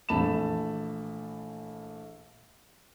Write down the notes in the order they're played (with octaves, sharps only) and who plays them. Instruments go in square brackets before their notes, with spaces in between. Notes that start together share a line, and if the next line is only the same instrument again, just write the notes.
[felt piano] A#1 E3 A3 A5 B5 E7